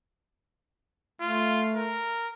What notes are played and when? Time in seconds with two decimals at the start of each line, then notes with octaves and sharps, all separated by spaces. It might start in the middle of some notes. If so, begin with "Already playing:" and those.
1.21 A3 F4
1.75 A#4